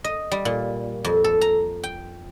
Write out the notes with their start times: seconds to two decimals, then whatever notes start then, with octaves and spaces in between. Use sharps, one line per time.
0.04 D#5
0.32 G3
0.45 A#2
1.05 F2
1.24 A4
1.41 A#5
1.84 G5